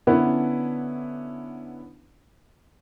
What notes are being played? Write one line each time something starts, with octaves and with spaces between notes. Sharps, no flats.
D3 B3 C#4 D4 E4 B4